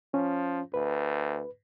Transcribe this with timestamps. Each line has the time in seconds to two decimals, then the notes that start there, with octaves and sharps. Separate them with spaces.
0.14 F3 C#4
0.74 D2 B4